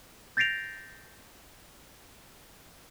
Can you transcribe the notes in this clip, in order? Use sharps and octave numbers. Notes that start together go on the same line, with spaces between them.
G6 A6 A#6 C7 D7 F7